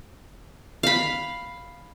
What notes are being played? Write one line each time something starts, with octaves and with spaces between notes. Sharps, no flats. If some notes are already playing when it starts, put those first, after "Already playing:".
F5 B5